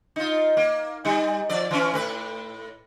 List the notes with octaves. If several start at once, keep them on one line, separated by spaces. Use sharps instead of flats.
D#4 F4
A#3
G3 D#4
F3 D5
E3 C#4
A2 B4